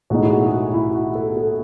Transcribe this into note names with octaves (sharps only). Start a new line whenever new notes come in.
B1 A2 G#3 D#4 F#4
E4
F#4
G#4
F#4
E4
F#4
A4
A4